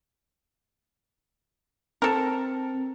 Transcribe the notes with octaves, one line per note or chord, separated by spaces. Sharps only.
C4 A4 A#4